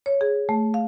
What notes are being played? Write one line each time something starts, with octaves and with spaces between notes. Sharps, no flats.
C#5
G#4
A3
F5